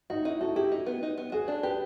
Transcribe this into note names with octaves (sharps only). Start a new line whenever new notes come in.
D#4 F#4
D#4 E4
F#4 A4
E4 G4
D#4
B3
D#4
B3
F#4 G#4
D4
G4 B4